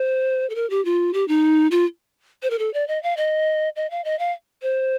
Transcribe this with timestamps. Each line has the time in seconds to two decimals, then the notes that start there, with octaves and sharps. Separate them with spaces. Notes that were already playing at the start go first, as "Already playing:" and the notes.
Already playing: C5
0.50 A4
0.55 A#4
0.70 G4
0.85 F4
1.14 G4
1.28 D#4
1.71 F4
2.43 C5
2.50 A#4
2.59 A4
2.74 D5
2.88 D#5
3.03 F5
3.17 D#5
3.76 D#5
3.91 F5
4.05 D#5
4.19 F5
4.62 C5